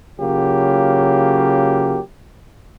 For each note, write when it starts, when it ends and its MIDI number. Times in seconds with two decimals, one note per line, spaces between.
0.20 1.99 49
0.20 1.99 54
0.20 1.99 58
0.20 1.99 65
0.20 1.99 67